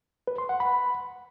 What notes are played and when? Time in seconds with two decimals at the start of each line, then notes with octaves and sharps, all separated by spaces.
0.27 B4
0.38 C6
0.49 F#5
0.60 B5